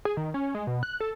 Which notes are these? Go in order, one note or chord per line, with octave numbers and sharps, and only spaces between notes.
G#4
D#3
C#4
G#3
B2
F#6
A4